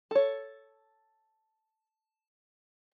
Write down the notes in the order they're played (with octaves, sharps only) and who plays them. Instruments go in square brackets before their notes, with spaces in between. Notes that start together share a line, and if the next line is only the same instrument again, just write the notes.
[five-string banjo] A4 C#5